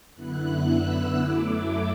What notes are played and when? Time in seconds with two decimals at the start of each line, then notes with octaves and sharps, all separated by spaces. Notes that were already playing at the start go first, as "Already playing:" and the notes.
0.14 F#2 D3 B3 E4 F#6
0.67 E6
1.20 F#2 F#3 A3 E4 D6